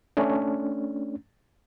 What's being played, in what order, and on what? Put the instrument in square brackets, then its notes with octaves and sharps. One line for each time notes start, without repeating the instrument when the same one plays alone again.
[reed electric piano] A3 C#4 D4